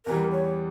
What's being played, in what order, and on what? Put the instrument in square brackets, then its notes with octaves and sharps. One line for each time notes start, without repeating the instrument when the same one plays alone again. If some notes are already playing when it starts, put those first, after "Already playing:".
[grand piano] E2 E3 G3 [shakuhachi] A#4
[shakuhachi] C#5